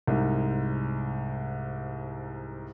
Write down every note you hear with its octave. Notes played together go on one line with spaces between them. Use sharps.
C2 G#2